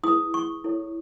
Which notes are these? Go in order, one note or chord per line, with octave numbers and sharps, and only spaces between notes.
E4 G#4 B4 D#6
C#6
E4 A4 C#5